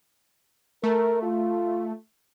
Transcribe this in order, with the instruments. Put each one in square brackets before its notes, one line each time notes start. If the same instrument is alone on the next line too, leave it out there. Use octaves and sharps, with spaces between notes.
[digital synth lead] A3 [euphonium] A#4
[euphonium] F4